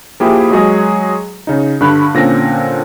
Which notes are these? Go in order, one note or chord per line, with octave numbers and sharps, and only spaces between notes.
F3 A#3 E4 G4 G#4
F#3 G#3 F#4 G#4 C#5 D#5
C#3 D#4
G2 D3 B5 F#6
A#2 D3 C4 C#4 A#6